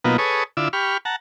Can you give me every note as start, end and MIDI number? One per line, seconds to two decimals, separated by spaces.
0.05 0.17 47
0.05 0.17 54
0.05 0.17 58
0.05 0.17 59
0.05 0.17 63
0.05 0.17 65
0.18 0.44 68
0.18 0.44 69
0.18 0.44 71
0.18 0.44 73
0.18 0.44 85
0.18 0.44 87
0.57 0.68 50
0.57 0.68 64
0.57 0.68 65
0.57 0.68 86
0.57 0.68 88
0.73 0.97 67
0.73 0.97 83
0.73 0.97 85
0.73 0.97 89
1.05 1.16 78
1.05 1.16 81
1.05 1.16 82